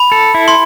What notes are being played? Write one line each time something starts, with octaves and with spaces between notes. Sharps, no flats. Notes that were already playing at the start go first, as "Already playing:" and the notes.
Already playing: B5
A4
E4
C6